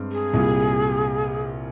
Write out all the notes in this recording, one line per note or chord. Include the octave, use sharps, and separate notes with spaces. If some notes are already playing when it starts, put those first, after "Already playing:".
Already playing: G2 G#3 C4
G#4
C2 A#2 G3